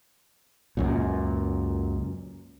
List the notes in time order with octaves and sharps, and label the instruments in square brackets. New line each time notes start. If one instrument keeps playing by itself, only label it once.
[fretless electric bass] C#2 F#2 A#2